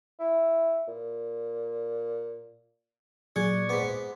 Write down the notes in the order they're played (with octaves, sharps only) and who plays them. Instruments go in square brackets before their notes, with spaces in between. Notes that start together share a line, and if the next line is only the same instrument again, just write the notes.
[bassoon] E4
A#2
[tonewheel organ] A#2 D5 C#6 [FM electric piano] F#3 [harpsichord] G#4
[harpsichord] G#2 B3 [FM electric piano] D6 B6